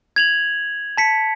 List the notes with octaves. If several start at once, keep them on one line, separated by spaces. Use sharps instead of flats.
G#6 F7 F#7
A5 B6 C#7